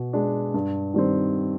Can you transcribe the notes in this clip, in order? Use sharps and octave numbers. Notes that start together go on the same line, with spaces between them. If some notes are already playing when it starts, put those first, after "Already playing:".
Already playing: B2
G#3 D4
G2
D#3 G3 C4